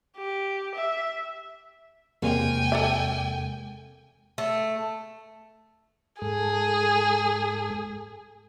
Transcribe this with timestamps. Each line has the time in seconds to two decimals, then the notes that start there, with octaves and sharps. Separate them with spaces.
0.17 G4
0.75 E5
2.22 E2 C3 G#3 A#3 G5 G#5
2.72 A4 D5 E5
4.38 A3
6.22 G#2 G#4 A4